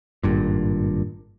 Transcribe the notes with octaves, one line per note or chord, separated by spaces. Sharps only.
G#1 G2 A#2